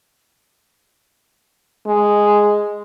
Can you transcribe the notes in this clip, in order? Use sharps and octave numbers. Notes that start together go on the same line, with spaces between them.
G#3